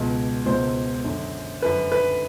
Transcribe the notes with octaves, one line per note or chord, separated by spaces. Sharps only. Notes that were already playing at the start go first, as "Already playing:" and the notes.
Already playing: C#2 B2
C#2 B2 C5
F#2 D3
F#2 D3 B4
B4